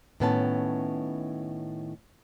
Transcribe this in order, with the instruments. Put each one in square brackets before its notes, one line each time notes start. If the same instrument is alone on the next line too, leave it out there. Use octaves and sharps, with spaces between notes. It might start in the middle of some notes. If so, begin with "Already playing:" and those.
[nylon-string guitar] A2 D#3 B3 C#4 E5 A5